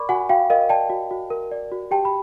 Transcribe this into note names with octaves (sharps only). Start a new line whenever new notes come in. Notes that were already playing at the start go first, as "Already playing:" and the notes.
Already playing: A#4 D5 B5 C#6 D6
F#4 F#5 G#5
F#4 F5 G5
A#4 D#5 F5
D5 G5 A5
F#4
F#4
A#4
D5
F#4
G4 G5 A5
B5